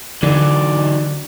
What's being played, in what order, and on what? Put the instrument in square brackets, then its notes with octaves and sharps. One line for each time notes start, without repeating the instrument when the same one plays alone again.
[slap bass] D3 [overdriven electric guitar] E3 F#3 [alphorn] D#4 [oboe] D5